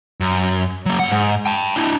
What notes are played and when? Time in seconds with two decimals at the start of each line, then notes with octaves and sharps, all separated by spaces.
0.20 F#2
0.86 F#3 A#3
0.99 G2 F#5
1.12 G#2
1.46 G5 A5
1.76 D4 E4